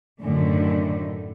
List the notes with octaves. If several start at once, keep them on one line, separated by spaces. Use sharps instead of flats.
F#2 A2 D3 D#3